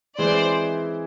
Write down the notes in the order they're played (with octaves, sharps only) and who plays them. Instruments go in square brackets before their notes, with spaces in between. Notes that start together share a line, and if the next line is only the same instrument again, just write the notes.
[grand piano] E3 G#3 C4 E4 [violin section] C5 D5